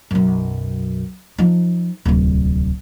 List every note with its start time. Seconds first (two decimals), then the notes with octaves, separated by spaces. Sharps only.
0.11 B1 F#2
1.38 F3 D#4
2.05 D1 C2